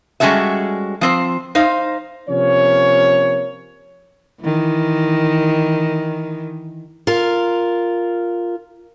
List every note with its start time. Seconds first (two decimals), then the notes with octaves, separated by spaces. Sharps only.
0.20 G3 G#3 C#4 F#4 A4 E5
1.01 F3 C4 C5
1.55 D#4 C5 F5
2.30 C3 F3 A#3 C#4 C#5
4.41 D#3 E3
7.07 F4 A#4